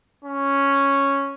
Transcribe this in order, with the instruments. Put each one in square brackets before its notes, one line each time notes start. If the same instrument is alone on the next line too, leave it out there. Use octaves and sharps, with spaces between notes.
[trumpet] C#4